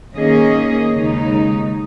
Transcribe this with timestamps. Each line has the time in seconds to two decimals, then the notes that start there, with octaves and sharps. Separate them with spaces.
0.14 D#3 A#3 C#4 G#4 D#5
0.93 D#2 C#3 G#3 D#4